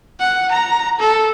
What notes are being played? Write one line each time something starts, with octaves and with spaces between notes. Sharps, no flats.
F#5
A#5
A4